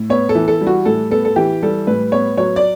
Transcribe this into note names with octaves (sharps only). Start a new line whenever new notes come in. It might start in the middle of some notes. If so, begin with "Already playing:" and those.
Already playing: A2
B3 C#5
A4
E3
A4
G3
F#4
A2 A4
B3 A4
A4
E3 G4
G3 A4
A2 B4
B3 C#5
F#3 C#5
D5